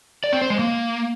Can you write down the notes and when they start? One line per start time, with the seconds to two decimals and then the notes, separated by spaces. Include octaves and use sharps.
0.24 D5
0.33 C4
0.41 C5
0.50 G#3
0.59 A#3